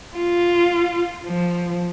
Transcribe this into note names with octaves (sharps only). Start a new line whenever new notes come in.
F4
F3